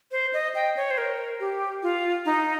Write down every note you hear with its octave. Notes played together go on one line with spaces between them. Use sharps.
C5
D#5
G5
C#5
C5
A#4
G4
F4
D#4